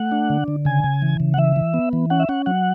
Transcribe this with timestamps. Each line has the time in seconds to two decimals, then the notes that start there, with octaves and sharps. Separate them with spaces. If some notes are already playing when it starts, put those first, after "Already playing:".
Already playing: A3 F#5
0.12 D4
0.30 D3
0.48 D3
0.65 C#3 G#5
0.84 C#3
1.02 E3
1.20 C#3
1.34 F#5
1.38 E3 E5
1.56 E3
1.74 B3
1.93 E3
2.10 C#4 F#5
2.20 E5
2.29 C#4 F#5
2.46 F#3 F#5